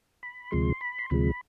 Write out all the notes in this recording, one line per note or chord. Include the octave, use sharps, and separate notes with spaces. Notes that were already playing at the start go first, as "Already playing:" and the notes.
B5
D2 C3 F3 G#3 C6
B5
C6
D2 C3 F3 G#3 B5